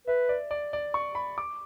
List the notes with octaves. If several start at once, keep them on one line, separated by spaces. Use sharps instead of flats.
B4 E5
D5
D5
D5
C#6
B5
D6